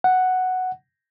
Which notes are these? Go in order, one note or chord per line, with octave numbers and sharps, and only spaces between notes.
F#5